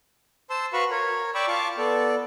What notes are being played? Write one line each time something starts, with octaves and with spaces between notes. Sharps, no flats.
C5 A5 C6 E6
F#4 B4 F5 B5 C#6
A#4 C#5
D5 G5 B5 C#6 D6 E6
F4 F5 A5 C#6 D6
B3 A4 D5